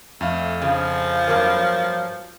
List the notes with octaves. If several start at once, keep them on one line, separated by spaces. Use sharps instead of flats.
F2 A3 F5
C#3 F3
G2 F#3 A#3